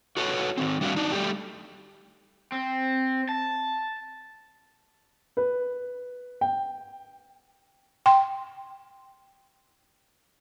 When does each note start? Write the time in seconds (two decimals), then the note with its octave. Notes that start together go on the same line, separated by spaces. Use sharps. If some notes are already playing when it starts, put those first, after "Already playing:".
0.17 F#4 A4 B4 C#5 E5 F#5
0.57 D#3 F3 C4
0.81 G3 D4 F#4 D5 E5 F5
0.96 D4 D#4
1.12 G3 A3 G4
2.52 C4
3.29 A5
5.37 B4
6.41 G5
8.06 G5 C6